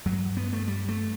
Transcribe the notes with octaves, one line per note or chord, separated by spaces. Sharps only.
G2 F#3
B3
A3
G3
A3